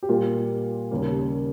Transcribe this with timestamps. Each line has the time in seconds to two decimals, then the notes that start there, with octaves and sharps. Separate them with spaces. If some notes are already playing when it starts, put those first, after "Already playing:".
0.03 G4
0.09 A#2 G3 A#3 F4
0.91 D#2 C#3 G3 A#3 C#4